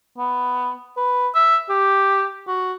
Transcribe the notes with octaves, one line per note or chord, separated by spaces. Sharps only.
B3
B4
E5
G4
F#4